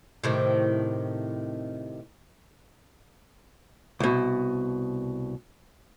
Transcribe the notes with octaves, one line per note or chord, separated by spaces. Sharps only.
A2 C3 D#3
C2 B2